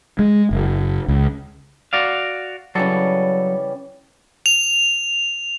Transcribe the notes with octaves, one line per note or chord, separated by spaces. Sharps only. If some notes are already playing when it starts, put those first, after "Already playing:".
G#3
F#1
C#2
F#4 D5 F5
C#3 E3 F#3 G3 A4
F7